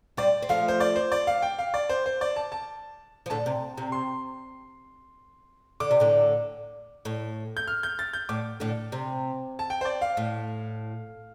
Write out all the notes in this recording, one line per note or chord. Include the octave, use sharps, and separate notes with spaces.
G3 C4 D5
C4
F3 A3 F5
C5
D5
C5
D5
F5
G5
F5
D5
C5
C5
D5
A5
A5
F3
A2 D3 A5
C3
C3
C6
D3 D6
C3
A2 D3
A2
G6
F6
G6
A6
G6
A2 D6
A2 D3
C3
A5
G5
C5
D5
F5
A2